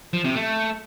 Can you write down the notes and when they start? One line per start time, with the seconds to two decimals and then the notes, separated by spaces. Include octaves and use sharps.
0.13 F3
0.24 C3
0.35 A3